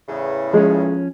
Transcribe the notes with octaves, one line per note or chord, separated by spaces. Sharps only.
E2 A2 C#3
F3 G#3 C#4